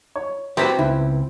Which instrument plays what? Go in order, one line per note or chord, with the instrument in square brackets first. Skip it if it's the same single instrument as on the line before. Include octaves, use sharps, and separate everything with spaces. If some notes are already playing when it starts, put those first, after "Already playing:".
[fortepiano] C#5
[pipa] C3 E3 G3 [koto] C4 [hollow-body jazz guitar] F#4 G4
[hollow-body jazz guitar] C#2 [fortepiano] E4